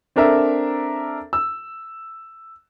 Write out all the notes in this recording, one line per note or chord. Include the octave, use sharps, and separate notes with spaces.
C4 D4 A4 A#4 E5
E6